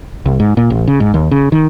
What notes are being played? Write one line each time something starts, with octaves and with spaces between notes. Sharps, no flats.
C2
G#2
A#2
A1
C#3
G#2
D#2
C#3
D#3